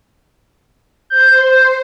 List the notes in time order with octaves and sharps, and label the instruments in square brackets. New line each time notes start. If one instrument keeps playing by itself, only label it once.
[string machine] C5 [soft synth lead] G6